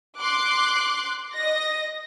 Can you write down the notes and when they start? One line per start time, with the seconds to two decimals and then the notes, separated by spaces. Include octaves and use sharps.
0.19 C6 D6 F#6
1.35 D#5 A#6